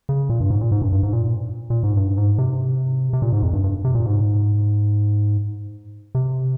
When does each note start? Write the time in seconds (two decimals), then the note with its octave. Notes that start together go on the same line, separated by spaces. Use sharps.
0.09 C#3
0.29 A#2
0.40 G2
0.50 G#2
0.61 A#2
0.72 G#2
0.82 G2
0.92 G2
1.03 G#2
1.13 A#2
1.70 A#2
1.83 G#2
1.97 G2
2.17 G#2
2.38 C3
3.13 C3
3.22 A#2
3.32 G#2
3.43 F2
3.53 G2
3.64 G2
3.85 C3
3.95 A#2
4.06 G#2
6.15 C3